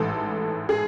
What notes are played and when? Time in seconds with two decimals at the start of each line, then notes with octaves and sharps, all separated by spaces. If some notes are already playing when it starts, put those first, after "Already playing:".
Already playing: A1 G#2 E3 A4
0.69 G#4